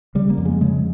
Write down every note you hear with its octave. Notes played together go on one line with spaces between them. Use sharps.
C#3 G3
A#3
F2
G#3
C#3 G#3